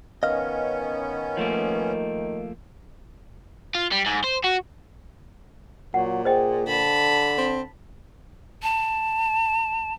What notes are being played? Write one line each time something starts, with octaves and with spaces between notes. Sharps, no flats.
D#3 B3 C#4 D#5 F5
F3 A3 A#3
F4
G3
G#2
C5
F#4
A#2 F#3 F#5
G#4 C5 D#5 G5
D3 A5 B5
C4
A5